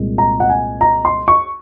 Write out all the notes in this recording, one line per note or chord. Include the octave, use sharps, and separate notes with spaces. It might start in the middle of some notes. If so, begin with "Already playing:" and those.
Already playing: C2 A#2 G#3
A#5
F#5
G#5
A#5
C6
C#6